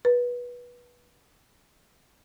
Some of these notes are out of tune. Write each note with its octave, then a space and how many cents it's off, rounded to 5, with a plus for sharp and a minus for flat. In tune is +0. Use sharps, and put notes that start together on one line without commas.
B4 -20